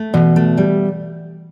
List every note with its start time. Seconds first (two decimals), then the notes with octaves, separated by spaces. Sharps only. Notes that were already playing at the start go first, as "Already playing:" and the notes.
Already playing: A3
0.14 B2 E3
0.36 A3
0.58 G3